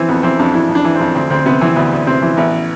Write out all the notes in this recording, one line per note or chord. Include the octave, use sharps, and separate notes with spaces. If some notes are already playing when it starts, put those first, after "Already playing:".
Already playing: E3 C4
F2 B3
E3 C4
F2 D4
E3 E4
F2
D4
E3
F2 C4
D2 C4
D2 C4
C3 B3
E3 C4
D2 B3
D2
C3 C4
E3
A1 B3